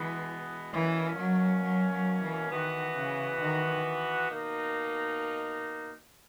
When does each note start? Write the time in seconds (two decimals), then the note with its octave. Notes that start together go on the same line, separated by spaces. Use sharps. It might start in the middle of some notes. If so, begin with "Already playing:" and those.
Already playing: B2 E3 G#3 B3
0.73 B2 E3 A#3 C#4
1.17 F#3
1.63 F#3
1.92 F#3
2.22 E3
2.51 D#3 E3 B3 F#4
2.97 C#3
3.40 D#3
4.31 B2 A#3 D#4